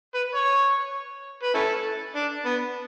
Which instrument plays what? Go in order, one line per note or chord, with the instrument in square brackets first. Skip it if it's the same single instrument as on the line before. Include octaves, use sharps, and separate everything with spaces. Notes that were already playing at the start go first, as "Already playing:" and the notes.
[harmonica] B4
C#5
B4
C#4 E4 A4
D4
B3